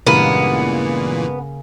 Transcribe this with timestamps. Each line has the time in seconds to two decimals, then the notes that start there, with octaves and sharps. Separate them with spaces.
0.07 G2 A#2 C#3 E3 G#3 A#3 B3 A#4